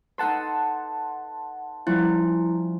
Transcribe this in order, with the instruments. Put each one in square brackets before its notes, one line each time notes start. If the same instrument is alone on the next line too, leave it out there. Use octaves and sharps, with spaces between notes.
[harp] D#4 A4 B4 [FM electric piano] F#5 A5 C6
[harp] F3 G3 C#4 [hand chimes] E4